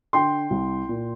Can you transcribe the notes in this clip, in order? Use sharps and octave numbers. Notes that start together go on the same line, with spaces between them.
D3 G5 C6
C2
A#2